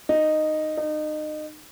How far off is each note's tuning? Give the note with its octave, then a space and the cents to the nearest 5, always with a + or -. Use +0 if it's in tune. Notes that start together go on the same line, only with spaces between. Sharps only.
D#4 -10
D#4 -30